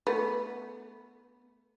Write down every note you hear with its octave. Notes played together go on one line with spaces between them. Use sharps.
A3 B3